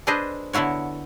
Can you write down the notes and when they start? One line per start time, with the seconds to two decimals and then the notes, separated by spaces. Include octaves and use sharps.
0.07 D4 G#4 A4 B4 C5 D#5
0.53 D3 B3 E4 F#4 C#5